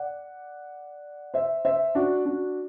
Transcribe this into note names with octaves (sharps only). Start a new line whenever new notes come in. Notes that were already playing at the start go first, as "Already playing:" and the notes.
Already playing: D5 F#5
C5 E5
C5 E5
D4 F#4
D4 F#4